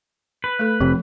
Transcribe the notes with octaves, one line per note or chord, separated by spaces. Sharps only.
B4
A3 A4
F1 C3 F3